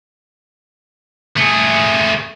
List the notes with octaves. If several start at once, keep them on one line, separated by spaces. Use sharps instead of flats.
A3 G#4